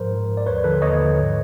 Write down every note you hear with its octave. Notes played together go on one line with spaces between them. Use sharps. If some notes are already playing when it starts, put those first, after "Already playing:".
Already playing: G#2 F3 A#4 C5
G#2
F3
D5
D#2 B4 C#5
D3 F3 A4 B4
D#2 C#5 D#5
D3 F3
G#2